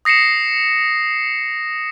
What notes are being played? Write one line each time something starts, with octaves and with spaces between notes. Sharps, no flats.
D#6 A#6 C7 C#7 E7